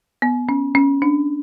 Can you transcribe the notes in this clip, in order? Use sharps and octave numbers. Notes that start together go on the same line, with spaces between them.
B3
C#4
C#4
D4